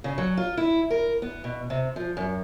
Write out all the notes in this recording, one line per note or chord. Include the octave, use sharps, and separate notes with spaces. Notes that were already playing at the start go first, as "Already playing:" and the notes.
C#3
F#3
F4
E4
A#4
B3
B2
C3
F3
F#2